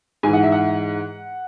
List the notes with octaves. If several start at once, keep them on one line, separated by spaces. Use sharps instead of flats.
G#2 E3 G#5
F#5
E5
F#5